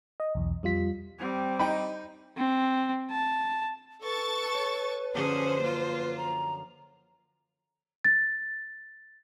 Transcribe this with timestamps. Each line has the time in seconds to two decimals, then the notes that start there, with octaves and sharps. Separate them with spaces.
0.20 D#5
0.35 B1 E2
0.63 F2 G3 F4 B6
1.19 G3 C4
1.59 D#4 G5 B5
2.37 C4
3.11 A5
4.03 A4 B4 C#6 A6
4.54 C#5
5.14 F#2 D3 F3 C#4 G#4 C5
5.61 A#3 F4
6.17 A#5
8.05 A6